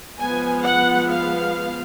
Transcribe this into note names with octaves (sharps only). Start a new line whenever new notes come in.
F3 G#3 B3 G#5
F#5
F5